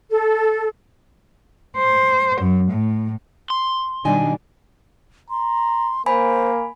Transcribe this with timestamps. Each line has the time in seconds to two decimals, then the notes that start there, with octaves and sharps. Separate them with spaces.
0.11 A4
1.77 C5
2.40 F#2
2.70 A2
3.50 C6
4.05 B2 D#3 G3 D4 D#5 G#5
5.30 A#5 C6
6.06 A#3 C5 G#5 B5